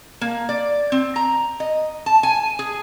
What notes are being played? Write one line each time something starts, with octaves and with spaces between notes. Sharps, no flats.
A#3
D5
C4
A#5
D#5
A5
G#5
G#4